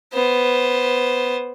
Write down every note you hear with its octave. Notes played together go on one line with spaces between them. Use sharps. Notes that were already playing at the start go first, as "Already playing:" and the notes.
B3 C5